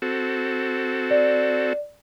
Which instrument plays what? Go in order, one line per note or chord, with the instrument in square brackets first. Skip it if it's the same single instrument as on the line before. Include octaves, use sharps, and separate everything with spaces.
[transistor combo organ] C4 F#4 A4
[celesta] D5